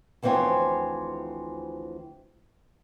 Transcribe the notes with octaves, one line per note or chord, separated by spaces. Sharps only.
D2 E3 F3 C4 C#5 G#5